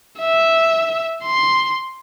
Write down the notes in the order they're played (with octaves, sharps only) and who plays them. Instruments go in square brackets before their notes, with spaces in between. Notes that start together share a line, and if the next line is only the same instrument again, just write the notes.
[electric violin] E5
C6